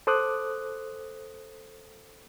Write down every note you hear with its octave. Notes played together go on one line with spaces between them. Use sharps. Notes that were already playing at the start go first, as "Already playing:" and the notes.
A4 C5 D6 D#6 F#6